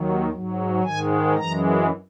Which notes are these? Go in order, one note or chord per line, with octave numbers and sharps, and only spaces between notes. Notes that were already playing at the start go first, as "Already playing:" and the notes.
Already playing: D#2 D#3 F#3
G#2 F#3
G#2 D#3 G#3 G#5
F#2 E3 G#3 A#5